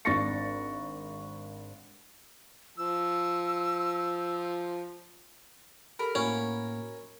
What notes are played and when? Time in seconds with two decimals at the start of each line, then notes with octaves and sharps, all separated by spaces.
0.05 G#1 D4 C#6 A6 A#6 C#7
2.78 F3 E6
5.99 G4 A4 A#4 B5
6.15 A2 A#3 C#4 F#4